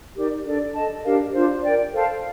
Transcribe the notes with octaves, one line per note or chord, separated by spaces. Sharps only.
D#4 G4 A#4 D5
D4 A4 D5
A4 D#5 A5
D4 G4 A#4 F5
D4 F4 C5
A#4 D5 G5
A4 C5 F5 A5